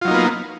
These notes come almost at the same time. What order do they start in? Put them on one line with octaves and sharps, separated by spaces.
F4 F#3 D#4 A#3 B3